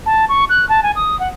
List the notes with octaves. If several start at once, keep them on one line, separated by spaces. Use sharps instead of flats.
A5
C#6
F#6
A5
G#5
D#6
F#5